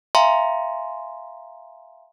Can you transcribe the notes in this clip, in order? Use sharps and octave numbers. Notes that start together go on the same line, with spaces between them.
E5 F5 G#5 A#5 C6